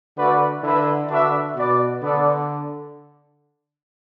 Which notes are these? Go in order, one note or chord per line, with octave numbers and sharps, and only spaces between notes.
D3 A3 F#4 B4 D5 F#5
D3 E4 B4 E5
D3 D4 F#4 B4 E5
B2 F#4 B4 D5
D3 B3 D4 A4 D5